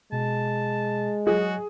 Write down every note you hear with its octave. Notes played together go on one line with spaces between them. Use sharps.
B2 G#3 A5
F#3 F#4 G#4 C#5 D#5